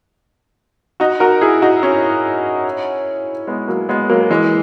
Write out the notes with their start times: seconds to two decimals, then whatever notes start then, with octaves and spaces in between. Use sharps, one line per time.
1.00 D#4 F#4
1.20 F#4 A#4
1.41 E4 G#4
1.62 D#4 F#4
1.83 C#4 E4
3.47 G#3 B3
3.68 F#3 A#3
3.89 G#3 B3
4.09 F#3 A#3
4.30 E3 G#3